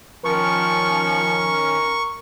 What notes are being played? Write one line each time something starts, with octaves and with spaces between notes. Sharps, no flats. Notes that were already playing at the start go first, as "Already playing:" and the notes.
D#3 F3 C#4 A#4 C#6